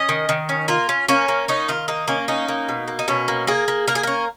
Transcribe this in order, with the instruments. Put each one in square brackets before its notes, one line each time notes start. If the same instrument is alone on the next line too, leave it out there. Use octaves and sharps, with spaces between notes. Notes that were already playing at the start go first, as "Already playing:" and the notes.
Already playing: [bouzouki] C#4 D#5
D#3
D#3
C#4
A#3 F4
C#4
A#3 C#4
A#3
C#4 D#4
D#3 F4
A#3 D#4
A#3 C#4
C#4 D#4
A#3
B2
A#3
D#4
B2 C#4
A#3
A#3 G#4
A#3
A#3 A#4
G#4
C#4 A#4